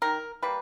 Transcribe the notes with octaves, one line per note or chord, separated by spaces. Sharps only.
D#3 A#4
G3 A#3 B4